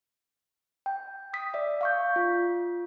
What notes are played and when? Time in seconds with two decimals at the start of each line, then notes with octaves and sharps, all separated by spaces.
0.86 G5
1.33 D#6 B6
1.54 D5 E5
1.81 F5 C#6 G6
2.16 F4